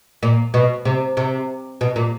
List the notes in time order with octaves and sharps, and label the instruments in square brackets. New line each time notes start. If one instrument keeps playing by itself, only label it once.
[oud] A#2
B2
C3
C3
B2
A#2